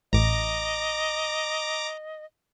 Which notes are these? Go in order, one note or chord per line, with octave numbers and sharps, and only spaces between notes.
A1 D#5 A#5 D6